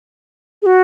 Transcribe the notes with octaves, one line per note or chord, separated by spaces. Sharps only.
G#4
F#4